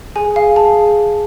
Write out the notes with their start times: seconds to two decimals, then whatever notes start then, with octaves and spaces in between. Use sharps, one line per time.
0.16 G#4 G#5
0.36 F5
0.56 G#4 A5